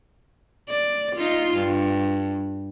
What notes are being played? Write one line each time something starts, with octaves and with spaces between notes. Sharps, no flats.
D5
D#4 F4
G2